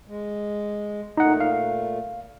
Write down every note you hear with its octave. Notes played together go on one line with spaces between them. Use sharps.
G#3
A#2 A3 D#4 F#5
F5